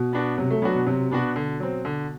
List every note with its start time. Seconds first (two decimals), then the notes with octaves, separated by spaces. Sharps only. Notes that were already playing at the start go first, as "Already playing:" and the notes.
Already playing: B2
0.13 B3 D4 F#4
0.38 C3 F#3
0.51 A3
0.62 F#3 B3 D4 F#4
0.75 B2
0.86 C3 F#3
1.11 B2 B3 D4 F#4
1.36 D3
1.60 F#3 C4
1.85 D3